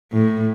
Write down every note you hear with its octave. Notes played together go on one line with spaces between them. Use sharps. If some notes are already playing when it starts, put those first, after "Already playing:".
A2